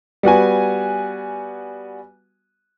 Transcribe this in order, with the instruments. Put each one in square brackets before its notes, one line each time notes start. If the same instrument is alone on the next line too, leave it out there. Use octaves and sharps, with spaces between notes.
[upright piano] G3 B3 F#4 G#5